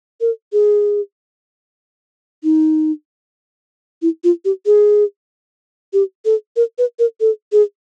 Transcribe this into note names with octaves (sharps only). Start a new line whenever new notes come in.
A#4
G#4
D#4
E4
F4
G4
G#4
G4
A4
A#4
B4
A#4
A4
G#4